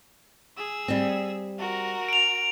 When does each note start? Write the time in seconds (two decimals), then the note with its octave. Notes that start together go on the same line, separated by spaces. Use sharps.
0.57 G#4 E6
0.88 G3 C4
1.58 F#4 A#4
2.09 D7 F7